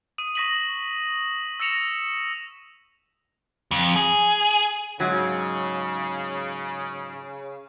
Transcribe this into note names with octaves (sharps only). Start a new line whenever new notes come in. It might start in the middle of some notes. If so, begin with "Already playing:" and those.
D#6 D#7
C#6 D#6 A#6 B6 D#7 F#7
E6 A#6 C#7 E7 F7
F2
G#4
G#2 C#3 F#3